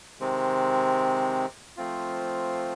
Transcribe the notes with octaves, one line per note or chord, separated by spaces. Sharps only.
C3 D#3 G#3 C4
F3 A3 C4 F4